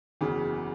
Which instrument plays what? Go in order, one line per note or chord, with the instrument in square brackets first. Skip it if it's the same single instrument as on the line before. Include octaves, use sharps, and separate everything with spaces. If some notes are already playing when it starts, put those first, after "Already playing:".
[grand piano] F#1 E2 C#3